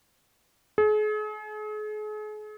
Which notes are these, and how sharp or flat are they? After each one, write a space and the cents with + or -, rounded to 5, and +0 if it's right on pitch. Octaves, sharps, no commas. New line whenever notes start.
G#4 +40